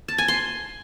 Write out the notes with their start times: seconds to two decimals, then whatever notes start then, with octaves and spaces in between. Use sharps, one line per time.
0.08 A5
0.18 G#5
0.28 C6